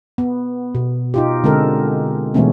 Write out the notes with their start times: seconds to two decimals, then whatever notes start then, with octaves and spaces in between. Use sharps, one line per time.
0.18 B3
0.75 B2
1.14 D#4 F4 G4
1.44 D3 G#3 C4 A4 A#4
2.34 B2 E3 G#3 A3 B3 C#4